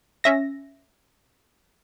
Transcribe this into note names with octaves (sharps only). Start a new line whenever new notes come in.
C#4 E5 A#6